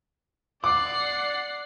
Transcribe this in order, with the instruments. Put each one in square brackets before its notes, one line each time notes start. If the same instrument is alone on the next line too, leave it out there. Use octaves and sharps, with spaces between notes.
[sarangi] D5 [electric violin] F#5 C7 [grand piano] D6